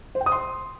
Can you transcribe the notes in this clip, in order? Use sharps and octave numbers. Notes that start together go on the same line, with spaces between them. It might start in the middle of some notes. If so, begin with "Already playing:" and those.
C5
G5
D#6
C6